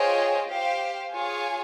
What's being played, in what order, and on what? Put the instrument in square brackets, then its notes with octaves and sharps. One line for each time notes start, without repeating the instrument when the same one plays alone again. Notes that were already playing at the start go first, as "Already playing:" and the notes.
Already playing: [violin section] F4 G#4 C5 D#5 G5 [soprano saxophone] C#5
[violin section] G4 C5 F5
F4 G#4 C#5 G#5